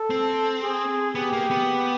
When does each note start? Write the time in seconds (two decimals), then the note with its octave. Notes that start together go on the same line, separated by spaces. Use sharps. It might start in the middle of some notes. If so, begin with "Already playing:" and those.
Already playing: A4
0.10 C4
0.63 G#4
1.15 B3 G4
1.33 A#3
1.51 B3